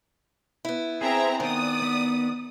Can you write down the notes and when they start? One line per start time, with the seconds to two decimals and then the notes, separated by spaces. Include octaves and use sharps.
0.65 B3 E4
1.01 C4 G#4 E5 A#5
1.40 D#3 B3 D5 D#6
1.82 B3